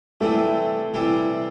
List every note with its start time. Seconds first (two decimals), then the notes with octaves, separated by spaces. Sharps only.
0.21 C3 E3 G3 A3 C4 E4
0.94 C3 E3 G3 C4 E4